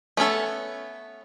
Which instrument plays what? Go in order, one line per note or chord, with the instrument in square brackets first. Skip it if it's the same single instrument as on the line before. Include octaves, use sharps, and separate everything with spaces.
[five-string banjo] A3 B3 C#4 A4